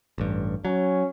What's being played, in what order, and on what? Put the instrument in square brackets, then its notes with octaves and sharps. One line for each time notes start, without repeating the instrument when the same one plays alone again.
[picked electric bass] A1 G2
[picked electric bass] F#3 [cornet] C#4